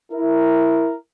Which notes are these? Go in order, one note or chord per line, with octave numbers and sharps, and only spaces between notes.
E4 A#4